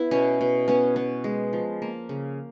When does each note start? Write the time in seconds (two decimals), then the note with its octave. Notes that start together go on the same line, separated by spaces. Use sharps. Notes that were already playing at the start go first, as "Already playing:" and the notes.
Already playing: B3 E4
0.11 B2 C#4
0.41 B2
0.68 B3 C#4
0.96 B3
1.24 G#3
1.53 F3
1.82 A#3
2.09 C#3